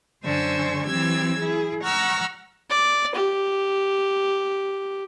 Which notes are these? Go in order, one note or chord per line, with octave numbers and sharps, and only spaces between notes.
F#2 D3 C5 G#5 C#6 E6
E3 F#3 C4 G4 E6 G#6
E4 G#4
F#5 A#5 C#6 E6 F6
D5
G4